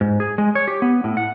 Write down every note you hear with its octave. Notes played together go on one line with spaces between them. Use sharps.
G#2
G#4
G#3
C#5
G4
B3
A2
F#5